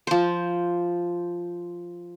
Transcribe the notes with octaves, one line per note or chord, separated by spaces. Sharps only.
F3 C5